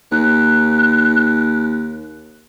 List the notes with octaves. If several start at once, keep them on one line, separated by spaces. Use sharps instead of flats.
D#2 F#6